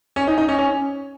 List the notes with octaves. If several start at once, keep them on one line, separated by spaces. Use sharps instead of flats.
C#4
D#4
D#4
C#4
C#4